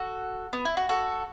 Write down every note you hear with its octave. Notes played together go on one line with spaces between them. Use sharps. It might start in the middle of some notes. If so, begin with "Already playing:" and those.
Already playing: F#4 A4
B3
E4
F#4
F#4 A4